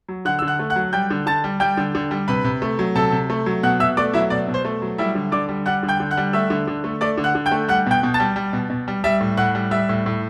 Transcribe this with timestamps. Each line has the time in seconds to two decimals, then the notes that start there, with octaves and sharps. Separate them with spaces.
0.08 F#3
0.25 D3 F#5 F#6
0.39 D3 E6
0.47 F#5 F#6
0.59 A3
0.70 F#5 F#6
0.76 F#3
0.93 G3 G5 G6
1.10 D3
1.26 D3 A5 A6
1.44 G3
1.60 G3 G5 G6
1.77 D3
1.95 D3
2.11 G3
2.28 C3 B4 B5
2.44 C3
2.62 A3
2.79 F#3
2.95 C3 A4 A5
3.12 C3
3.30 A3
3.46 F#3
3.63 B2 F#5 F#6
3.80 B2 E5 E6
3.97 A3 D5 D6
4.13 F#3 E4 E5
4.30 B2 D5
4.48 B2
4.54 C5
4.65 A3
4.82 F#3
4.98 G3 E4 E5
5.15 D3
5.32 D3 D5 D6
5.49 G3
5.66 G3 F#5 F#6
5.83 D3
5.88 G5 G6
6.00 D3
6.11 F#5 F#6
6.17 G3
6.33 A3 E5 E6
6.50 D3
6.67 D3
6.84 A3
7.01 A3 D5 D6
7.18 D3
7.24 F#5 F#6
7.35 D3
7.46 G5 G6
7.52 A3
7.68 G3 F#5 F#6
7.86 B2 G5 G6
8.03 B2
8.14 A5 A6
8.20 G3
8.36 G3
8.53 B2
8.70 B2
8.88 G3
9.04 G3 E5 E6
9.21 A2
9.37 A2 F#5 F#6
9.55 G3
9.71 G3 E5 E6
9.89 A2
10.06 A2